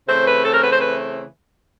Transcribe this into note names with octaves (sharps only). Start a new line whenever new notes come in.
C#3 E3 A3 C4 C5
B4
A4
A#4
B4
C5
B4